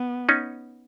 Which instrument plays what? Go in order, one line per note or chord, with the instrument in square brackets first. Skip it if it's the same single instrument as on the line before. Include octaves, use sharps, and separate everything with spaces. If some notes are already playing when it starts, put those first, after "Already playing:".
Already playing: [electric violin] B3
[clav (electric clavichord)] C#4 D#4